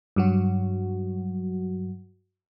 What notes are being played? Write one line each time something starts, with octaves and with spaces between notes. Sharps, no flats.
G2 F#3 F#4